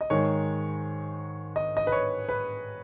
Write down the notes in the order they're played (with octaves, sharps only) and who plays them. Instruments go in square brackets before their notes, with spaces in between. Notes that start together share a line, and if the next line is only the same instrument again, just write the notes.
[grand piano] D#5
G#2 D#3 G#3 C#5
D#5
D#5
B4
C#5
B4